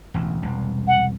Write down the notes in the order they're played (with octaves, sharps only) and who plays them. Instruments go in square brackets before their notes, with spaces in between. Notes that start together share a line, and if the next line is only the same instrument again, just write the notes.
[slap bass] E1 A1 D2
E1 C2
[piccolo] F#5